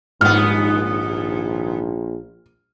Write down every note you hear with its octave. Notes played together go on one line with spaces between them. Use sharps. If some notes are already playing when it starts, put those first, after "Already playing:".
A#1 D#2 G#2 B3 F6